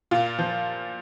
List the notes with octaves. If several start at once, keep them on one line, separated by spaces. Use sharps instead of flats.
A#2 F4
F3